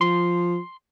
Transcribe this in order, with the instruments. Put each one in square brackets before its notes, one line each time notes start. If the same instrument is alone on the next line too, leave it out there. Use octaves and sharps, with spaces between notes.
[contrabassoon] F3 [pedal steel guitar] C6